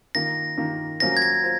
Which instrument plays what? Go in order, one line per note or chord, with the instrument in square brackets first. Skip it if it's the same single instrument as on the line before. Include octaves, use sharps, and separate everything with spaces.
[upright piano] D#3 A#3 F4 [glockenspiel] A#6
[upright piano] D#3 A#3 F4
[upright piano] F#3 A#3 C#4 F4 C5 [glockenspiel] A#6
[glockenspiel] G#6
A#6
[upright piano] F4 C5